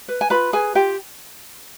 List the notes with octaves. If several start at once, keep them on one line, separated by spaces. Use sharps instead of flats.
B4
G#5
F4 B4 B5
G#4 B4 G#5
F4 G4 G5